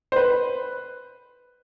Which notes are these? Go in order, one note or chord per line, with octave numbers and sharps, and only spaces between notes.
C5
B4